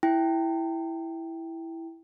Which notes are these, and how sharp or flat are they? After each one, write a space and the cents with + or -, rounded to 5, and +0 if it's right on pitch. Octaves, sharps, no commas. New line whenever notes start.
E4 +0 G5 +0